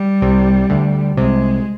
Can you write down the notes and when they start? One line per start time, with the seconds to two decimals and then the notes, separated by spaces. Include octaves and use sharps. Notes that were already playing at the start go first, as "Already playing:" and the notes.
Already playing: G3
0.22 C2 C3
0.70 D2 D3
1.17 C2 C3 G#3